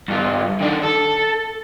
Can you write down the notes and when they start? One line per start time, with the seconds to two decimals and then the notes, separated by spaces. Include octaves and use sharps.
0.08 G2 F4
0.61 D#3 D4
0.83 A4